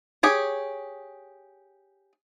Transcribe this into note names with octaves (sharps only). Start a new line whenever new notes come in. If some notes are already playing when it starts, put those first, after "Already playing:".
G4 G#4 C#5